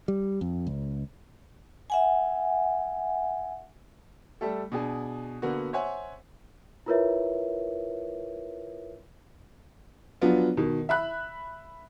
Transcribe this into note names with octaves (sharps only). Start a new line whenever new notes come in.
G3
F2
C#2
E5 F#5 G#5
G3 A3 A4
B2 D4 G#4
D3 A#3 B3 F#4
C5 C#5 E5 F#5 G#5
E4 F4 A#4 B4 C#5 E5
F3 F#3 B3 D4 F4
B2 D#3
E5 B5 F#6